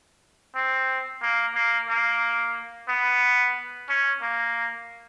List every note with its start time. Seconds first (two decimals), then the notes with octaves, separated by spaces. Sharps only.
0.55 C4
1.22 A#3
1.55 A#3
1.89 A#3
2.88 B3
3.89 C#4
4.22 A#3